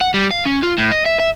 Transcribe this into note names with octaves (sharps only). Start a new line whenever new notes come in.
F#5
G3
F5
C#4
F4
A2
D#5
E5
E5